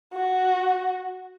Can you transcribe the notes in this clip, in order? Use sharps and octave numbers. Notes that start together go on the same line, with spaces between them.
F#4